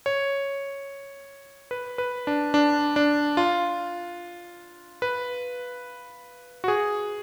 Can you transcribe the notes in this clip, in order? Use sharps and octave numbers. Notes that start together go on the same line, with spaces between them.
C#5
B4
B4
D4
D4
D4
F4
B4
F#4
G#4